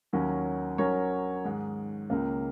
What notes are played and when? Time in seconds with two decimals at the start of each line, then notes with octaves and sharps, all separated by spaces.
0.13 D#2 D#3 F#3 C#4 A#4
0.78 F#3 C#4 A#4 C#5
1.44 G#2 D#3 G#3
2.10 C#2 C#3 A#3